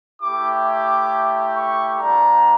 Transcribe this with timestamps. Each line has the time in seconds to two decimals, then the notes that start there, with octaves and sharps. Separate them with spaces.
0.21 A3 E4 G4 D6
0.65 D6
1.55 C#6
1.99 G3 A#3 D4 A#5